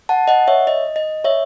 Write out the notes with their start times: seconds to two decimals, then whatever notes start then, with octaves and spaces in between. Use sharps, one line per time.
0.09 F#5 A5
0.28 D#5 F#5
0.47 C#5 E5
0.67 D#5
0.96 D#5
1.24 C#5 E5